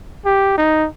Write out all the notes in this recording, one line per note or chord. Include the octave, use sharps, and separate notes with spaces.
G4
D#4